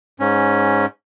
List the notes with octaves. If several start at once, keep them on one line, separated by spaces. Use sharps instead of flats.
G#2 C#4